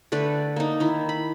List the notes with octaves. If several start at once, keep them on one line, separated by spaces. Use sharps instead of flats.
D3 A3 B4 D5
A#3 D#4
D#3 E4
B5